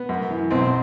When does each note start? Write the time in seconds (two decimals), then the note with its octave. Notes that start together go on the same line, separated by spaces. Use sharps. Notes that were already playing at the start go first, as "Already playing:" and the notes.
Already playing: B3
0.09 F#2
0.30 E3
0.51 B1 C4